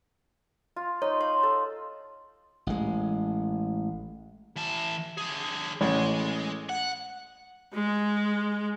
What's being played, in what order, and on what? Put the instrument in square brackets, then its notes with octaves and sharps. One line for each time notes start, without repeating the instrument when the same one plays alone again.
[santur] F4
[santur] D#4 C6 [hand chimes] C#5
[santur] F5 [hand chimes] C6
[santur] A4
[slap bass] A1 G#3
[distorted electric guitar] E3 A5
D3 G#4
[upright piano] A1 [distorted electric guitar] G#3
[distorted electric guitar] F#5
[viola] G#3